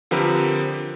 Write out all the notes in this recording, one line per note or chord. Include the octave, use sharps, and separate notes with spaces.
D3 F3 C4 G4 A#4 B4